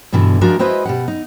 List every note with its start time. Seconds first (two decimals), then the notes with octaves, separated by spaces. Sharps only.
0.12 G2 B2 D3 E3
0.41 F3 G#3 D4 F4 F#4 A#4
0.59 G#3 E4 F#4 B4 C5 D#5
0.85 B2 G4 F#5
1.08 D#4